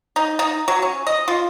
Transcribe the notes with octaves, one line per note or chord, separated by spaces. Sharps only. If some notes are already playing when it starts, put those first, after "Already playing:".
D#4
D#4
F#3
C#4
D#5
F4